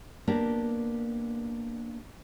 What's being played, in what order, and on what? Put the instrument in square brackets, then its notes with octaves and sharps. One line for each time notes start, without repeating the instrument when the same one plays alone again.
[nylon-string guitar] A#3 B3 D4 G4 A#4